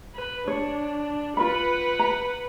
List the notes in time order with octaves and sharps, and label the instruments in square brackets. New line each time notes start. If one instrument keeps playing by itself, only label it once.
[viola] B4
[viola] D4 [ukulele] C#5
[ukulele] F4 A#4 B5 [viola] B4 F#5
[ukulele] A#5